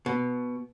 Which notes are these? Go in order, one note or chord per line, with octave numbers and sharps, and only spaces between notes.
B2